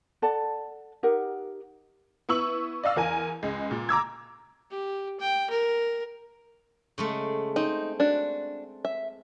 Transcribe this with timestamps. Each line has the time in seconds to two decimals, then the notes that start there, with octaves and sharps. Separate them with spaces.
0.22 A4 D5 F#5 A5
1.03 D#4 G4 A#4 F#5
2.29 B3 E4 C#6 E6 F#7
2.83 D5 D#5 F5 E6
2.96 E2 A#4 G#5
3.43 C#2 G#3
3.71 A#2
3.89 A#5 D6 E6 G#6
4.71 G4
5.20 G5
5.50 A#4
6.98 C#3 G#3 A3
7.56 C4 D#4
8.00 D4 F#4
8.85 E5